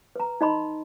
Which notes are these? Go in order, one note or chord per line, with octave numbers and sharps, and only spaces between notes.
B4 A#5
D#4 D#5 B5 C6